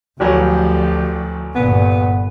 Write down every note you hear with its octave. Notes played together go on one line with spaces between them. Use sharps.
A1 D2 F3 F#3 G4
G1 A#2 B3